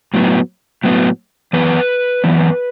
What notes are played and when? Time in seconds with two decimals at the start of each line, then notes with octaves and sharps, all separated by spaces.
0.14 A2 F#3 B3
0.84 A2 F#3 B3
1.53 F#2 E3 B3 B4
2.24 F#2 E3 B3